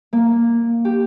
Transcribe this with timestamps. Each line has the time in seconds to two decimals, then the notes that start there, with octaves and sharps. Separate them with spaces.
0.13 A#3
0.85 G4